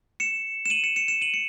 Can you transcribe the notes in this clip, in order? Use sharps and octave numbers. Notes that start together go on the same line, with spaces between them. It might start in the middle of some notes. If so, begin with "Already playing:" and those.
C#7 E7
E7
D#7 F#7
C#7 E7
C#7 E7
C#7 E7
D#7 F#7
C#7